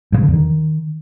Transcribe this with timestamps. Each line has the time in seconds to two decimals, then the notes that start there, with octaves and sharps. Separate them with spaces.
0.12 G2
0.18 C3
0.23 D3
0.28 E2
0.33 D#3